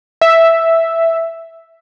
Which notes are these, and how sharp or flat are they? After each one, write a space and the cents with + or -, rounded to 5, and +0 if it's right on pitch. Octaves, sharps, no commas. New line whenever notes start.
E5 +0